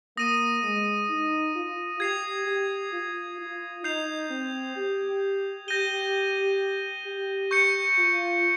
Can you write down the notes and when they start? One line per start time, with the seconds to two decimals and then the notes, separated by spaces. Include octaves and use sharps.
0.17 A#3 D#6 A#6 D#7
0.63 G#3
1.09 D#4
1.55 F4
2.00 G4 G#6 C7 F7
2.46 G4
2.92 F4
3.38 F4
3.84 D#4 G6 C7 F7
4.30 C4
4.76 G4
5.67 G4 G6 A#6 D#7 G7
7.05 G4
7.51 C#6 G6 C#7
7.97 F4